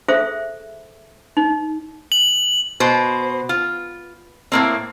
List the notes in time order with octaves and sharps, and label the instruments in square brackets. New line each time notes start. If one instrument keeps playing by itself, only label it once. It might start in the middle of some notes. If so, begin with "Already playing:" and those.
[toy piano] G#4 A4 C5 E5 F5
D#4
[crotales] F#7
[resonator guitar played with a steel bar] B2 C5
F4
A2 A#3 C4